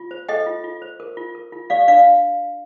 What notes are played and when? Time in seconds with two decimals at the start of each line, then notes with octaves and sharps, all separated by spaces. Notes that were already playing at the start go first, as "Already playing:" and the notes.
Already playing: F4
0.11 C5
0.29 A4 D#5 G5
0.46 F4
0.64 F4
0.82 C5
1.00 A#4
1.17 F4
1.35 A#4
1.52 F4
1.70 G4 D5 F5
1.88 D4 D5 F5